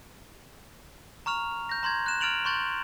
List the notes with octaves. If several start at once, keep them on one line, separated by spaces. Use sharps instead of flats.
A#5 C#6 F6 F7
G6 A#6
A#5 C6 G6 G#6
F#6 E7
F6 A6 D7 F7 F#7
C6 C#6 G6 A6